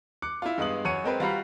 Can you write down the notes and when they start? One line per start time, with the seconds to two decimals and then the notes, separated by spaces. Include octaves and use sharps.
0.22 D6 F#6 C#7
0.42 E4 F4
0.58 G2 G#3 B3 F5 D#6 F#7
0.85 F#2 C#5 F#5 C#7 D#7
1.04 G#3 C4 A#4 B4
1.20 G3 F4 F#4 A#5 B5 C7